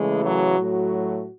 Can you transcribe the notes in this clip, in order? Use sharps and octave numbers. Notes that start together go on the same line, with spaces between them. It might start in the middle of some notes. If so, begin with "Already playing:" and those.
Already playing: C#3 E3 G#3 A3
F#3 F#4
A2 F#3 A3